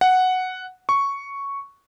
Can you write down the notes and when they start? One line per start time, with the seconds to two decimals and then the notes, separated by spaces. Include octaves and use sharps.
0.01 F#5
0.89 C#6